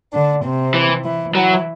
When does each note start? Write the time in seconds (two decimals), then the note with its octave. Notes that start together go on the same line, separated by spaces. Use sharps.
0.13 D3 D4
0.44 C3 C4
0.74 E3
1.04 E3 E4
1.34 E3 F#3 E4